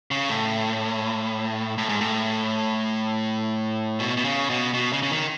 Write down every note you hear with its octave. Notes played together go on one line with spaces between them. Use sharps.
C#3
A2
A2
G#2
A2
B2
B2
C#3
B2
B2
C#3
C#3
D#3